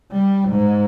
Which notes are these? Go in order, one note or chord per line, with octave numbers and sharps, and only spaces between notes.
G3
G#2